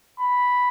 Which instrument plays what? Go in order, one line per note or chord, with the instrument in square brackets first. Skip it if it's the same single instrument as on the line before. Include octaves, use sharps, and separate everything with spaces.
[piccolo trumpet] B5